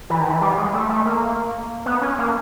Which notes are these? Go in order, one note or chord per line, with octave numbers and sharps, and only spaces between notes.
E3
D#3
E3
G3
G#3
A3
A3
A#3
B3
C#4
A#3